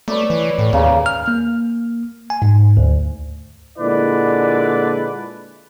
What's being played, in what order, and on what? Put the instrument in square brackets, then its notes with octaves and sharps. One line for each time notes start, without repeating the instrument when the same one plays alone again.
[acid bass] A3 [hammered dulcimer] B4 C#5 D5
[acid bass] E3
A2
[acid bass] D#2 [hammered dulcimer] C#3 A#3
[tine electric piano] F6
A#3
G#5
G#2
D2
[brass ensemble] A#2 D3 G#3 E4 B4 D5